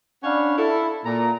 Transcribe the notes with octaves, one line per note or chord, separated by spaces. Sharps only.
C#4 D4 C#5 F5 F#5 B5
E4 A4
A#2 A#5